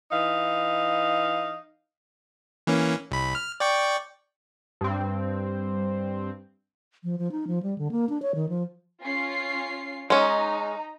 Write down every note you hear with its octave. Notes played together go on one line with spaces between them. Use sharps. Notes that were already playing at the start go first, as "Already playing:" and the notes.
E3 D#4 F5
E3 A#3 C#4
C2 B5
F6
D5 G5 C#6
G2 C4
F3
F3
D#4
F3
G3
D3
A#3
D4
C#5
D#3
F3
C#4 F4 C7
G#3 C#4 D#4 A#5